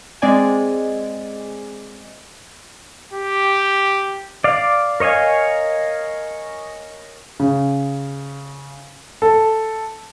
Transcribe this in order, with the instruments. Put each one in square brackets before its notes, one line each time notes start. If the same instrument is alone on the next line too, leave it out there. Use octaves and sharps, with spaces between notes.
[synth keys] G#3 C4 D5 G#5
[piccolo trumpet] G4
[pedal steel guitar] D5 F5
A#4 C#5 D#5 F5 G#5
[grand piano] C#3
A4